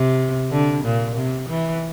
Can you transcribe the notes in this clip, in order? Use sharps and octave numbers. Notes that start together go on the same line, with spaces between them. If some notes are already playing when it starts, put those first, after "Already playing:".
Already playing: C3
D3
A#2
C3
E3